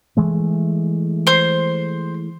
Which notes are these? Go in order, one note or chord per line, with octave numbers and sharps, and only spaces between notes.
E3 G#3 A3
C5 C6